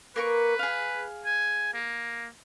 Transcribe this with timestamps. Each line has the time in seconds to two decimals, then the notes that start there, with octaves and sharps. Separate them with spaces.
0.16 A#3 A#4 B4 C#6
0.59 G#4 F5
1.25 G#5
1.73 A#3